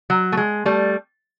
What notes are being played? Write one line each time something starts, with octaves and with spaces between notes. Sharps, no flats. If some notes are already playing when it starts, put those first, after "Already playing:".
F#3
A3
G#3
G3 A3